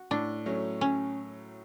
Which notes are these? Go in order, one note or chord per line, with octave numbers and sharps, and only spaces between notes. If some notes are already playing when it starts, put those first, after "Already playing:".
Already playing: F#4
A2 D4
F#3 A3 C#4
C#4